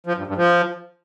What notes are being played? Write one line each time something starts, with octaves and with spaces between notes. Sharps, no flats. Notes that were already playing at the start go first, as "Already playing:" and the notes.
F3
G2
G2
F3